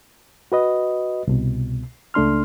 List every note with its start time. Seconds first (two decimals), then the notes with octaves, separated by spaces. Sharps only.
0.52 F#4 B4 D#5
1.27 C2 B2
2.14 C#2 A3 D4 C6 F6